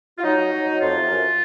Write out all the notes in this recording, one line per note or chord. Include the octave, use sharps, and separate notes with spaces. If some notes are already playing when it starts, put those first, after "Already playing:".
F4
F#3 D#4
F#3
F#3
F#3
F2 F4
C3
F#2